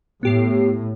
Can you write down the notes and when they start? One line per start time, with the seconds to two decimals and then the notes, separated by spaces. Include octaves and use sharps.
0.23 A2 B3 G4 C7